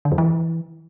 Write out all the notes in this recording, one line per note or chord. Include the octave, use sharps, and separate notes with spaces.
D3
F2
E3